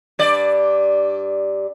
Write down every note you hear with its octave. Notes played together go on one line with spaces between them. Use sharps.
G2 D5